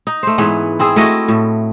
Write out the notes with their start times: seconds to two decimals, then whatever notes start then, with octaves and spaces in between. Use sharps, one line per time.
0.07 D#4
0.23 A3 C5
0.38 G#2 E3 B3 C#4
0.79 C4 E4 G#4
0.96 A3 E4 F#4 D#5
1.28 A2